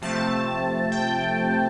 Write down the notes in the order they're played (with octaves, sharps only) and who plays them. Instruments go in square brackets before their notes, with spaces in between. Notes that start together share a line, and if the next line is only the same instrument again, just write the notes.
[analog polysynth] C3 F3 A3 C4 A5
G5